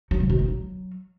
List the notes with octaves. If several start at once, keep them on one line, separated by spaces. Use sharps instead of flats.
F#3
C3
B2
C4
F#3